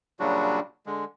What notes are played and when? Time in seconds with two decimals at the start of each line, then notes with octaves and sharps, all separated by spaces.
0.20 A#2 C#3 F#3 G3 D4 F#4
0.86 D3 G#3